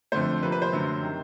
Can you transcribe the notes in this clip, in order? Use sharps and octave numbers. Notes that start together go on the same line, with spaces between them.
F2 D3 F3 A3 C5
C3 F3 A#3 B4
B4
C5
F#2 D3 F#3 A3
C3 D#3